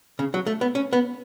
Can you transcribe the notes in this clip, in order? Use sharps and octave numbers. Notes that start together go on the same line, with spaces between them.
C#3
F#3
A3
B3
C#4
B3